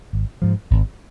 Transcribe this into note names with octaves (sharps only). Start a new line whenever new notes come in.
G#1
G#2 F3
G#1